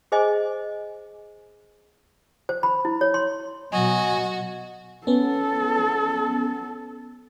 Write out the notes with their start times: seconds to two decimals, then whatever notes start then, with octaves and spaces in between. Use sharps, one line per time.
0.12 G#4 C5 D#5 G#5 D6
2.49 C5
2.63 B5
2.85 E4
3.01 C#5
3.14 C6
3.72 B2 F#3 F#4 D#5 G#5
5.07 B3 C#4 A4